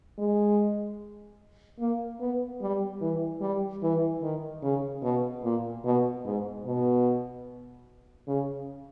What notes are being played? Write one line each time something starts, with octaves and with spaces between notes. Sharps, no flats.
G#3
A#3
B3
G3
E3
G3
E3
D#3
C#3
B2
A#2
B2
G#2
B2
C#3